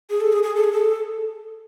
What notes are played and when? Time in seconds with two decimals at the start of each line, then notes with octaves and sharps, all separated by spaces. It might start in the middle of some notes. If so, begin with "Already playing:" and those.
0.10 G#4
0.21 A4
0.33 G#4
0.43 G#4
0.55 A4
0.64 G#4
0.73 A4